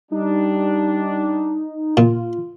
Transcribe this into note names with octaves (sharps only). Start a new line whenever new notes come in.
G3 D4 D#4
A#2 F4